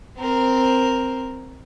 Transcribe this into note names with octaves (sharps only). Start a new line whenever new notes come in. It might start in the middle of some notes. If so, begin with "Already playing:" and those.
C4 A#4